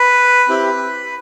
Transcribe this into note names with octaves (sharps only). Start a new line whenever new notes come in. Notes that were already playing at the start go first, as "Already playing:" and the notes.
Already playing: B4
C4 E4 G4